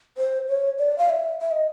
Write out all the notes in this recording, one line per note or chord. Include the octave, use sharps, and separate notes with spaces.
C5
C#5
D5
F5
E5
E5
D#5